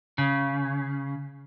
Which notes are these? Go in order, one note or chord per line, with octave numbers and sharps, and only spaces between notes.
C#3